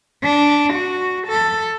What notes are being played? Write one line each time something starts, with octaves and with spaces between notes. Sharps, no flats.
D4
F#4
A4